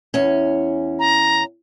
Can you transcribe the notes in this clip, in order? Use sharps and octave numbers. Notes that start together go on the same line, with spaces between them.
E2 C#4
A#5